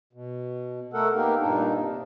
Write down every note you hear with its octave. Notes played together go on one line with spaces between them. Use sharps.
B2
A3 A4 A#4 F#5
A#3 B3 D#4 G4 A#4
G2 A#2 D4 D#4
C3